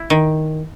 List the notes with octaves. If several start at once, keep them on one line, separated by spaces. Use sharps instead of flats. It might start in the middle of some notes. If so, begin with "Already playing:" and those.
Already playing: E4
D#3